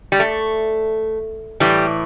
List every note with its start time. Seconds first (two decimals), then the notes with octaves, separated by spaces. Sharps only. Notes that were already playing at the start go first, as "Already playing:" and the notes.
0.12 G3
0.20 A3
1.60 A2 E3 G3